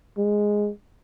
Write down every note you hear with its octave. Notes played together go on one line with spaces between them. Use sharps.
G#3